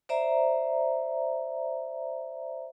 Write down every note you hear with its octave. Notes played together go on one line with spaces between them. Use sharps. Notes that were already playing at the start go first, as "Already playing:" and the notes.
C5 D5 E5 A#5